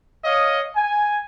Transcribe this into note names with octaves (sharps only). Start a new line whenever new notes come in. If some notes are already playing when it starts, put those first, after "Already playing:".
C#5 D#5 F5 D#6
G#5